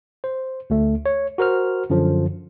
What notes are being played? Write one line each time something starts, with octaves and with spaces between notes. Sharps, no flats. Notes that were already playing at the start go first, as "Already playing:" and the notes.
C5
D2 A3
C#5
F#4 A#4 C5 F6
F#2 D3 F3